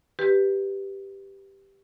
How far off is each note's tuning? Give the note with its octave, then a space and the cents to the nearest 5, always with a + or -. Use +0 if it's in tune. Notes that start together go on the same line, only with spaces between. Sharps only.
G4 +0 B4 +0